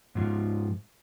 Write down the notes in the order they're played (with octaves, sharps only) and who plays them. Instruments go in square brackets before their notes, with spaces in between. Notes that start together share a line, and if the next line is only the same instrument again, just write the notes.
[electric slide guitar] G#2 F3